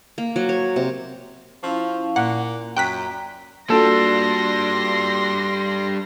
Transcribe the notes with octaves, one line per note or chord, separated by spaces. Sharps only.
A#3
F#3
C#5
C3
F3 C#4 E4 F5
A#2 A#3 F#5
F#2 G5 A#5 F#6 B6
G3 A#3 D4 F4 F#4 A4 C6 A#6